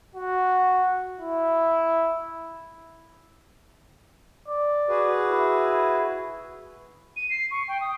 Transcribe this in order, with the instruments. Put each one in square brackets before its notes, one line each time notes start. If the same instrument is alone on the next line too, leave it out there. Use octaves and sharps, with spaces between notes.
[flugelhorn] F#4
E4
[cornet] D5
[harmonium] F#4 G#4 B4
[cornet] E4
[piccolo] D#7
C7
C#6
G5
D#6